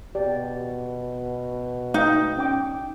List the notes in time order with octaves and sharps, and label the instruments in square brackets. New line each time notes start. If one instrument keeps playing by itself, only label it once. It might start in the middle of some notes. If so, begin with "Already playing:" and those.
[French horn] B2 [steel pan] G4 D5
[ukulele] D#4 [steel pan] F5 G5
[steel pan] C#4 G5 D6